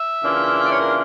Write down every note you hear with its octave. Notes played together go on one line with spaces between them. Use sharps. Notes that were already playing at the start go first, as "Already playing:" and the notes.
Already playing: E5
C#3 E3 A#3 D4 F4
D5
C#5
A#4